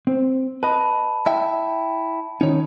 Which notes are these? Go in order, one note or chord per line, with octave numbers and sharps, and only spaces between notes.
C4
B4 D#5 A5 B5
E4 E5 G5
D#3 C#4 D#4 C#5